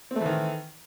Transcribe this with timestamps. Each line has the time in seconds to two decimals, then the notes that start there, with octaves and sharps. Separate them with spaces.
0.11 C4
0.16 A3
0.21 E3
0.25 D#3